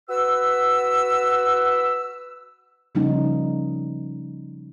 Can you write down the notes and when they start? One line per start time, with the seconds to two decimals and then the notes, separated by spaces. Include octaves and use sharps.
0.09 F#4 B4 E6
2.95 C#3 F3 G3 A#3 C#4 D#4